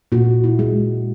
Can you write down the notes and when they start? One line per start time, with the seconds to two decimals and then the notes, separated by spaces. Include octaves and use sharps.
0.12 A#2 F#4
0.44 E4
0.59 G#3